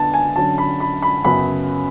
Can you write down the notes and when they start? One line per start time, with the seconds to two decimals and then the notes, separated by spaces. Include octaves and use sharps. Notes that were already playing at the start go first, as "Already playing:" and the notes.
Already playing: D3 B3 A5
0.14 G#5
0.36 D3 F#3 C#4 A5
0.58 B5
0.80 B5
1.02 B5
1.25 F#2 C#3 F#3 B3 B5